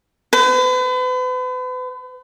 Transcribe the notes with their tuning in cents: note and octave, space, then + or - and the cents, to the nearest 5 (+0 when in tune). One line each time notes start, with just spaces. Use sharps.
B4 +40